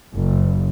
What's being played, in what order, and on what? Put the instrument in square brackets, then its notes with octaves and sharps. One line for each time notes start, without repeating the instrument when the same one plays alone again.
[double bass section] F#1